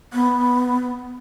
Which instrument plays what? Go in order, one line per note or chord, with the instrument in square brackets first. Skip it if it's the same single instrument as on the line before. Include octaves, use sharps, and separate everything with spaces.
[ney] B3